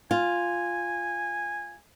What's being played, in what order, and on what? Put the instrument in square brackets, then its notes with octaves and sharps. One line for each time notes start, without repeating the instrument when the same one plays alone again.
[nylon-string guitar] F4 [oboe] G#5